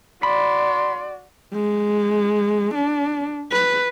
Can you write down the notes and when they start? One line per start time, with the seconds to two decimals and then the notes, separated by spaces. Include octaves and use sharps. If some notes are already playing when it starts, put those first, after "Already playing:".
0.23 F#4 D5 B5 C6
1.53 G#3
2.75 D4
3.52 B4